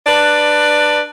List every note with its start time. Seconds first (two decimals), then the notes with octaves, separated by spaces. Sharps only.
0.07 D4 B4 D5